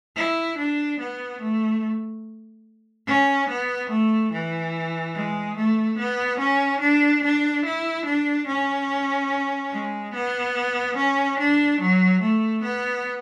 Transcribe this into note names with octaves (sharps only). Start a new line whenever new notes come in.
E4
D4
B3
A3
C#4
B3
A3
E3
G#3
A3
B3
C#4
D4
D4
E4
D4
C#4
G#3
B3
C#4
D4
F#3
A3
B3